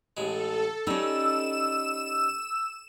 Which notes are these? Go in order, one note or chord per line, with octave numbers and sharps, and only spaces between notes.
A1 G#3 A4
G3 C#4 D#4 E6 E7